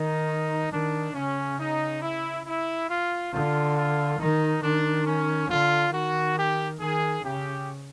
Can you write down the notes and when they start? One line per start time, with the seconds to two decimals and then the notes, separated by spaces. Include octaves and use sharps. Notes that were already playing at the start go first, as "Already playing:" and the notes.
Already playing: D#3 D#4
0.72 D#3 D4
1.14 C#3 C#4
1.58 D#4
2.02 E4
2.46 E4
2.89 F4
3.32 D3 F4
3.75 F4
4.19 D#3 D#4
4.63 D#3 D4
5.06 C#4
5.49 D3 F4
5.92 D#3 F#4
6.37 G4
6.80 D#3 G#4
7.23 C#3 G4